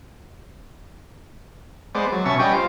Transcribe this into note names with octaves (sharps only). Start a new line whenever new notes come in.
G#3 B3 C5 D5
F#3
B2 C#4 E5 A5 C#6
G3 B3 C#4 D#5 G5
F4 C5